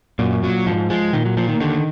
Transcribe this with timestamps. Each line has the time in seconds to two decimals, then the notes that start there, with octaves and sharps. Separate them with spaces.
0.19 F#2 A#2
0.43 A#2 F#3
0.66 G#2 F3
0.90 F3 G#3
1.13 A#2 D#3
1.25 F#3
1.37 F3 A#3
1.48 D#3
1.60 D3 D#3